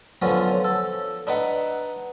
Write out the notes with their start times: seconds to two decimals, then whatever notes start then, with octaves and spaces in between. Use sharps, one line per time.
0.22 D3 F3 F#3 B3 C#4
0.64 A4
1.27 D4 D#4 B4 F#5